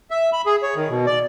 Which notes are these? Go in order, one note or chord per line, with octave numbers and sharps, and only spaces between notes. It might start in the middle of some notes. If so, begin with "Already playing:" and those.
E5
B5
G#4
C#5
D#3
B2
D5